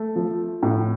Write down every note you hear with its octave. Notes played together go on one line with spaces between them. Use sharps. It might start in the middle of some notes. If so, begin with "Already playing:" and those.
Already playing: A3
F3
A2